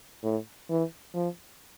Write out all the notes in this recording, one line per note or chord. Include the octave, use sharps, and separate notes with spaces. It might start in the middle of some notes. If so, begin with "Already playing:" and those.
A2
E3
F3